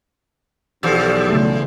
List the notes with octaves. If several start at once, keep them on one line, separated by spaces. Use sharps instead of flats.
B1 E2 F3 G4 A4
C#3 E3 A3